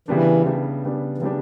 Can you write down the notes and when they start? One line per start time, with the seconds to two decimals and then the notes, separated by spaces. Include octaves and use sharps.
0.08 C#3 E3 G3 B3 D4
0.46 C#3 G3 B3 D4
0.84 C#3 G3 B3 D4
1.18 E3
1.22 C#3 F#3 G3 B3 D4